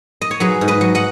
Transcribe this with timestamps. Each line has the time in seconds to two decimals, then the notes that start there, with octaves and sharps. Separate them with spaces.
0.22 D#5
0.31 C#5
0.40 F#3 G#4 B4
0.61 G#2
0.68 B4 D#5
0.81 F#3
0.95 D#5 F#5